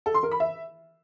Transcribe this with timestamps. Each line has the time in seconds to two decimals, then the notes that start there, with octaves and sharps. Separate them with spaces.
0.06 A4
0.14 C6
0.23 A#4
0.31 B5
0.40 E5